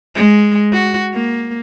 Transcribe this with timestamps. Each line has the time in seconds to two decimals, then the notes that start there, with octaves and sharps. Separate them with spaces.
0.15 G#3
0.73 F#4
1.14 A#3